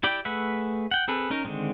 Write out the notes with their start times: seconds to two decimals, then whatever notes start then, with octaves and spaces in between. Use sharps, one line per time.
0.03 E4 G4 D5 G5
0.25 A3 G#4 B4 E5 F#5
0.91 F#5 G5
1.08 C4 G#4 A4 B4
1.30 C#4 D#4 A#4
1.45 D3 D#3 G#3 C4